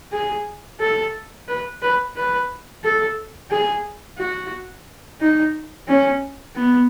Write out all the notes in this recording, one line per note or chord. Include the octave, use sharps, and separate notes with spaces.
G#4
A4
B4
B4
B4
A4
G#4
F#4
D#4
C#4
B3